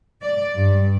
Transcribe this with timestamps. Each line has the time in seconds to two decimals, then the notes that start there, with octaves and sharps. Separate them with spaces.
0.23 D5
0.55 G2